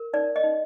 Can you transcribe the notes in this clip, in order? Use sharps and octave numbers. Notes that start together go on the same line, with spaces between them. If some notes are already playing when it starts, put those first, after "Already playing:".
Already playing: A#4
D#4 D5
D#5
D#4